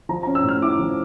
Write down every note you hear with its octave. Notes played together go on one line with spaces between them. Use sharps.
F3 A#5
A#5
C#4
E6
A2 F6
E4 D6
F3